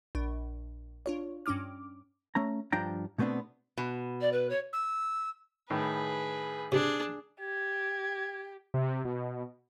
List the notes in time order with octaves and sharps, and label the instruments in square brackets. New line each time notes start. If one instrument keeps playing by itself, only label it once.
[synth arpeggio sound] A#1 D4
D4 F4 C#5
G2 C#4 D4 D6 F6
[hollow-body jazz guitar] A3 C#4 A#5
G2 F3 D4 G5 A#5
B2 A3 B3 C4 D4
[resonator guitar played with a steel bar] B2
[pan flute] D5
B4
C#5
[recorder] E6
[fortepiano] A2 D#3 [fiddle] G#4 B4
[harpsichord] C3 [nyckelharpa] D4 G#4
[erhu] G4 [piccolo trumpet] G#6
[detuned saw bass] C3
B2